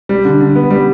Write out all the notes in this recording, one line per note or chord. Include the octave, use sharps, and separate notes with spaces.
G3
D3
D3
B3
G3